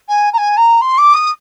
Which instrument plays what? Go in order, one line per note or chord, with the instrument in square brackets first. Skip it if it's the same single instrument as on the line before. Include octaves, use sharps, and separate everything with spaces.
[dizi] G#5
A#5
G#5
A#5
C6
D6
D#6